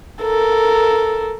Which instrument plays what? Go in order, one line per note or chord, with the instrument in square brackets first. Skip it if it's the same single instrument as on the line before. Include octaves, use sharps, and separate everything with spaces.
[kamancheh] A4 A#4